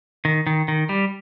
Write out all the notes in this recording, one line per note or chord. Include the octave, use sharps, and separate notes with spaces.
D#3
D#3
D#3
G3